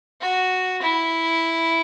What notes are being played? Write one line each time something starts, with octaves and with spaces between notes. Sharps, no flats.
F#4
E4